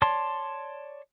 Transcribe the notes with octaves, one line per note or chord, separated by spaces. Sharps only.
C#5 D5 A5 C6